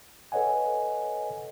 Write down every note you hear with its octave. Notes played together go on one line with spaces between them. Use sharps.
A4 B4 C#5 D#5 F#5 G#5